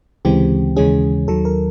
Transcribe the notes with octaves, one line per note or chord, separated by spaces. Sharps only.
D2 C#3 E3 G#3 C4 G4
D#2 C#3 E3 G#3 C#4 G#4
D#2 D#3 F#3 A4
A#4